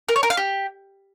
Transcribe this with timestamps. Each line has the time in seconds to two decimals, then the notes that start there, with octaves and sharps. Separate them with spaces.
0.09 A#4
0.16 C#5
0.23 A#4
0.30 F5
0.37 G4